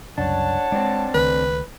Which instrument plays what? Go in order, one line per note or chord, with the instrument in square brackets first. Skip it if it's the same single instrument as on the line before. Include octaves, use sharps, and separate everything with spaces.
[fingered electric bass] C2 F#2 C#3 [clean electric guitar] D4 [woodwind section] C#5 F#5 A5
[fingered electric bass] G#3 [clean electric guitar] C4 D4
[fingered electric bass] C#2 D#3 A3 [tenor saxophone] B4